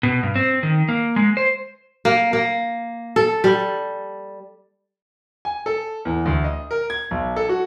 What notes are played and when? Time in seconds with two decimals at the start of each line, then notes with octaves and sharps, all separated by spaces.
0.03 B2
0.23 G2
0.35 C4
0.63 D#3
0.89 A#3
1.16 G#3
1.37 C5
2.05 A#3
2.33 A#3
3.16 A4
3.44 G3
5.45 G#5
5.66 A4
6.05 E2
6.26 D2
6.45 D#5
6.71 A#4
6.90 G#6
7.11 B1
7.36 A4
7.49 F#4